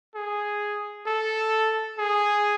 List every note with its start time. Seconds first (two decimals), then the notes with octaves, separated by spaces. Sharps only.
0.15 G#4
1.06 A4
1.98 G#4